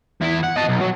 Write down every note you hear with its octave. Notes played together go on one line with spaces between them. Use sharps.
E2 E4
F#5
D#5 A5
B1
F#3